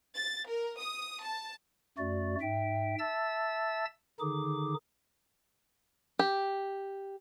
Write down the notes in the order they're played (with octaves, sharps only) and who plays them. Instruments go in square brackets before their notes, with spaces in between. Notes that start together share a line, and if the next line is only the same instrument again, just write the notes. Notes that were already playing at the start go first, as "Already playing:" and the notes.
[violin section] A6
A#4
D#6
A5
[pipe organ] F#2 A3 F#4 D5
G#2 E5 G5
E5 A5 E6 A6
D3 D#3 D#4 G#4 D6
[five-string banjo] G4